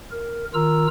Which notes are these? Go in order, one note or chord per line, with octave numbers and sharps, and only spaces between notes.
A#4
D#3 F4 A#4 A#5 E6